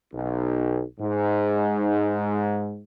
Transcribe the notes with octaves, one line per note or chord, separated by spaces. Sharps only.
B1
G#2